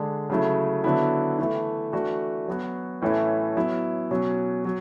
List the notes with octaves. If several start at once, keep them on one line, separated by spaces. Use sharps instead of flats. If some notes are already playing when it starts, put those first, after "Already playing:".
Already playing: D3 G#3 D4
C#3 F#3 A3 E4
D3 F#3 B3 E4
E3 A3 E4
E3 A3 D4 F#4
F#3 B3 F#4
A2 E3 A3 C#4 E4
F#3 B3 E4
B2 F#3 C#4
F#3